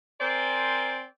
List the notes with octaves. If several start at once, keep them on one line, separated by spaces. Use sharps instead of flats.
C4 A#4 C5 D5 G#5